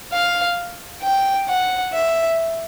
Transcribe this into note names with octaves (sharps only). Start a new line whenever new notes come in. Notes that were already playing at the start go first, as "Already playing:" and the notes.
F5
G5
F#5
E5